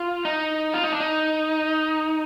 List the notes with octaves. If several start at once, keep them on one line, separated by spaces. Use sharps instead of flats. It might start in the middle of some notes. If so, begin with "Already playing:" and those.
Already playing: F4
D#4
F4
D#4
D4
D#4